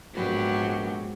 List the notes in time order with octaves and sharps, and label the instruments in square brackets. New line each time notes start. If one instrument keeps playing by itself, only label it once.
[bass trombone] A#1 [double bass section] G#2 [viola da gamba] F#3 [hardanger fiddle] B3 G4